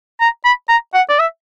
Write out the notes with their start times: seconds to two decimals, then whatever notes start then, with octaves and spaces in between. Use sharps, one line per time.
0.20 A#5
0.45 B5
0.69 A#5
0.94 F#5
1.09 D5
1.19 E5